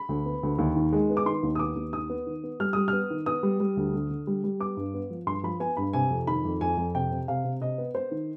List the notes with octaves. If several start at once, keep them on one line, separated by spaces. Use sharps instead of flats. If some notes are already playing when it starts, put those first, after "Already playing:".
Already playing: B5
D2
B3
D2
D#2
D#3
G#3
B3
D6
D#3 C6
D#2
D#6
B3 D6
D#2
D#3 D#6
B3
D#3
B3
G3 F6
G3 D#6
B3 F6
D#3
B3 D#6
G3
G3
D2
D3
D3
G3
G3
B3 D6
G2
B3
F3
G2 C6
F3 B5
B3 G#5
G2 B5
C3 G#5
F2
D#3 B5
F2
F2 G#5
F2
C3 G5
C3
C3 F5
C3
C3 D#5
B3
B3 C5
D#3